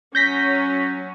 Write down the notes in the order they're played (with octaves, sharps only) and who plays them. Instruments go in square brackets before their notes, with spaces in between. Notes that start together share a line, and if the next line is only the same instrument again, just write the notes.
[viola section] F#3 C#4 [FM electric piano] G6 A#6 B6